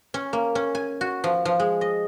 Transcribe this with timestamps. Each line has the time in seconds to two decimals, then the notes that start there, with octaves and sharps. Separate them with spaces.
0.14 C#4
0.33 A#3
0.55 C#4
0.75 G#5
1.01 F#4
1.24 F3
1.45 F3
1.60 G#3
1.81 D#5